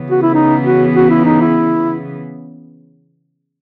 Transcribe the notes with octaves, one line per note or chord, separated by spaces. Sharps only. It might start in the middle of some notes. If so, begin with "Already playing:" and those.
Already playing: C#3 E3 B3
F#4
E4
D#4
F#4
F#4
E4
D#4
E4